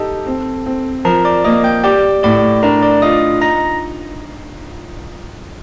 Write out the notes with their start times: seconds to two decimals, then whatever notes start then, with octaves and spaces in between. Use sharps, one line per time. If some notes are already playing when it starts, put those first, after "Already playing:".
Already playing: D#4 G4 A4 A5
0.26 C4
0.66 C4
1.05 F3 A#4 A#5
1.25 D5 D6
1.44 A#3 D#5 D#6
1.64 G5 G6
1.84 G4 D5 D6
2.23 A2 D5 D6
2.63 D4 A#4 A#5
2.83 D5 D6
3.02 F4 D#5 D#6
3.41 D#4 A#5 A#6